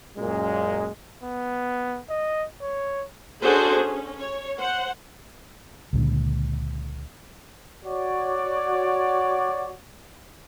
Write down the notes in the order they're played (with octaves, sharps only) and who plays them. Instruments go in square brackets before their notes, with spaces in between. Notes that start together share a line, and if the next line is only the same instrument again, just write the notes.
[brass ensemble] F#2 A#2 G#3
[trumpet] B3
D#5
C#5
[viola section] C#4 D4 F#4 G#4 A4 C5
C#4
C#5
C5 F#5
[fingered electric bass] C#2 A#2 D3
[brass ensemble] F#4 C#5 D5